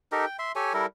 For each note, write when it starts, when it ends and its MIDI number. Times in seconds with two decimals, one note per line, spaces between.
0.12 0.25 63
0.12 0.25 67
0.12 0.25 69
0.12 0.25 70
0.25 0.37 79
0.39 0.52 76
0.39 0.52 84
0.56 0.73 67
0.56 0.73 69
0.56 0.73 73
0.56 0.73 80
0.74 0.86 55
0.74 0.86 64
0.74 0.86 69
0.74 0.86 70